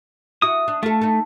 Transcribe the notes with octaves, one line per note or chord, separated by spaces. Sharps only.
E4 F#4 D#6
D4
A3 F4 A4
D#4 A4